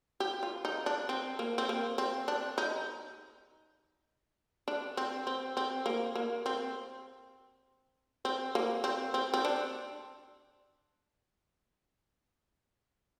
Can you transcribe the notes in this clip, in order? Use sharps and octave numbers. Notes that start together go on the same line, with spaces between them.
G4
F4
D#4
D4
C4
A#3
C4
A#3
C4
D4
D#4
D4
C4
C4
C4
A#3
A#3
C4
C4
A#3
C4
C4
C4
D4